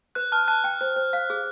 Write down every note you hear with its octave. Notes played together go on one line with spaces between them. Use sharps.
B4 F#6
A5 F6
A5 F#6
G5
C5
C5
F5
G#4